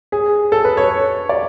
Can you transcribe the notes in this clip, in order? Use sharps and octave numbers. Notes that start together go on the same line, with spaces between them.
G#4
A4
B4
C#5
D5